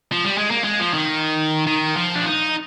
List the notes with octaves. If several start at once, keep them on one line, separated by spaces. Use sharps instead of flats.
F3
G3
G#3
A#3
G#3
F3
D#3
D#3
F3
D4
D#4